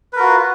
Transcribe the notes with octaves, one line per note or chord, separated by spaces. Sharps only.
F4 F#4 A#4 B4